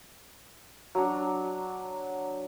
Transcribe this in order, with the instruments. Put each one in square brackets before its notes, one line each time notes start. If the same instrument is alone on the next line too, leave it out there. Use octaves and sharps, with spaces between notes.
[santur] F#3 D4